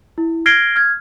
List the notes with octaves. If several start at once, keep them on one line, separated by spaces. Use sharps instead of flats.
E4
F6 G#6 A#6 C7 D7 G7
F6 G#6